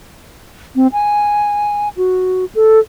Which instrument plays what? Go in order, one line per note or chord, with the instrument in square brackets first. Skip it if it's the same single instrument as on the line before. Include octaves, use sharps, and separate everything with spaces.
[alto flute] C4
G#5
F#4
A4